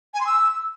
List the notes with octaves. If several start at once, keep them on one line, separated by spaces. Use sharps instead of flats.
G#5
C6
E6